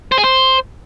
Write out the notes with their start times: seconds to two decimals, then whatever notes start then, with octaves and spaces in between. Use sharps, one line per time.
0.12 C5
0.18 G#4
0.24 C5